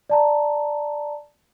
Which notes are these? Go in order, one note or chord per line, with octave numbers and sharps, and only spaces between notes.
D5 A5 A#5